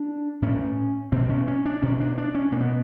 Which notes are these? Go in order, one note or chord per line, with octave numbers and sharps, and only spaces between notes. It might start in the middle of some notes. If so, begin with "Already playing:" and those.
Already playing: D4
A2 C#4
B2 C4
C#4
C#4
D4
B2 C#4
D4
D4
C#4
B2 A#3
B3